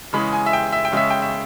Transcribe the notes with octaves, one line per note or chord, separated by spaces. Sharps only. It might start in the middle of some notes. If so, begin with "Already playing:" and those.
C#3 E3 G#3 C#4 B5
G#5
E5
G5
E5
G5
C#3 G#3 C#4 E5
G5
E5